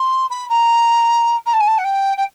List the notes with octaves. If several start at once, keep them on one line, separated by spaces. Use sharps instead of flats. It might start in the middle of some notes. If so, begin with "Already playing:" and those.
Already playing: C6
B5
A#5
A#5
A5
G#5
A5
F#5
G5
G5